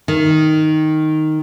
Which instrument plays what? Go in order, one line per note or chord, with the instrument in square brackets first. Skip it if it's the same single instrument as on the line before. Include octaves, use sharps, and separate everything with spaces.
[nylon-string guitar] D#3